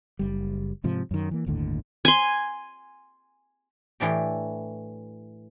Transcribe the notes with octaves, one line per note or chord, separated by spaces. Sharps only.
F#1 G3
G#2 C3 F3
F#2 D#3
E3 A#3
G1 D#2 A2 D3
G#5 C6
A2 E3 D4 G4